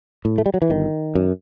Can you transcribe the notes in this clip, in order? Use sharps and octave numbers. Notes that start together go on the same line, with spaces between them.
A2
A3
G3
F#3
E3
G1 D#3
F#2